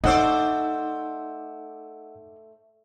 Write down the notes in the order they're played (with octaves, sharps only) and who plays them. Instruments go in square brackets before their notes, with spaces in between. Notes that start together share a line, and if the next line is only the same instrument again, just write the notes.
[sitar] A3 C5 D5 [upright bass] D#4 [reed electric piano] D#5 F#5 E6